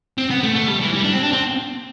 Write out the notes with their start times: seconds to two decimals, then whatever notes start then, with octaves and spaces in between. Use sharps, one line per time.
0.18 C4
0.30 B3
0.44 A3
0.56 A3
0.68 G3
0.81 E3
0.94 G3
1.04 D4
1.13 C4
1.23 D4
1.33 C4